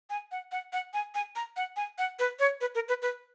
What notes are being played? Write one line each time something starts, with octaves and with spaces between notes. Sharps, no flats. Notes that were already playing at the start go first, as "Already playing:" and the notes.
G#5
F#5
F#5
F#5
G#5
G#5
A#5
F#5
G#5
F#5
B4
C#5
B4
A#4
B4
B4